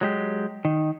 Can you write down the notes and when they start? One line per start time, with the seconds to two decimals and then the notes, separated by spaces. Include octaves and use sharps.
0.01 F#3 G#3 G4
0.65 D#3